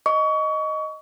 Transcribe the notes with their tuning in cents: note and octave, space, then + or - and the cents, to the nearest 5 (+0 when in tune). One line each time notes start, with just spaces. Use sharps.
D#5 +0 C#6 +30